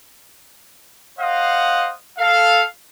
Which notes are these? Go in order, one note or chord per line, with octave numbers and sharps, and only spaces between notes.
C5 D#5 F5 F#5
A4 F5